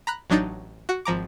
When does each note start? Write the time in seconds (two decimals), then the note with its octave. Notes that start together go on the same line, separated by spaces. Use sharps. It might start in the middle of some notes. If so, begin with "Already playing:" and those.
0.07 A#5 B5 F#6
0.30 A1 F#3 D4 D#4 G6 A6
0.89 F#4 F#5
1.05 G#1 F3 A#5 D6